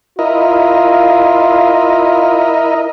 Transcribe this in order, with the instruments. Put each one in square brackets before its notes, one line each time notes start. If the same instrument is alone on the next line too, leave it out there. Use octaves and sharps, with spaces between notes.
[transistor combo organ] E4 A#4 D#5 [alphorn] F4